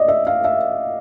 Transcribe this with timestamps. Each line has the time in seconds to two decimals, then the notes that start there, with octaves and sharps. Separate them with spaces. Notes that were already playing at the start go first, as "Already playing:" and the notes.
Already playing: D5 D#5
0.08 E5
0.27 F5
0.44 E5